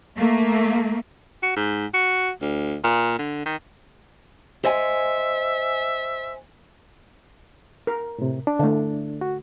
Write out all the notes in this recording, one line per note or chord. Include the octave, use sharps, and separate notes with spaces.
A3 A#3
F#4
G#2
F#4
D2
A#2
D3
D#3
C5 D#5 E5 G#5
A#4
A2 C3
D4
D3 A3
F#4